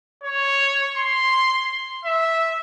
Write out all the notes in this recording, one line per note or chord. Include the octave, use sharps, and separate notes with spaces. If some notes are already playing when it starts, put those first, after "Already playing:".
C#5
C6
E5